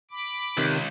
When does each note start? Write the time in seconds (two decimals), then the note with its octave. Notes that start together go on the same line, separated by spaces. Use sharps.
0.11 B5 D6
0.57 C#2 C3 D#3